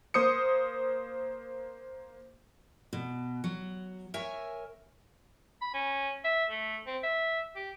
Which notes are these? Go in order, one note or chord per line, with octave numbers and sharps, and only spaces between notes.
A#3 C5 D#6 C#7
B2
F#3
A#4 C#5 E5 G#5
B5
C#4
E5
A3
C4
E5
G4